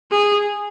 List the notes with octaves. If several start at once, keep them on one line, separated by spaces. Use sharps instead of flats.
G#4